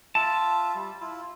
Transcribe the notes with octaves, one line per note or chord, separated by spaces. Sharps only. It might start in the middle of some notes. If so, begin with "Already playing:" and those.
F4 E5 A5
G3
E4 F4